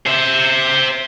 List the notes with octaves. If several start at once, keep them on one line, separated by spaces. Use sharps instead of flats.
C5 E5